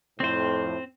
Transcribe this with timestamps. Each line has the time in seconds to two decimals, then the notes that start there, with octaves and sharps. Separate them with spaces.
0.20 F2 A2 C4 C5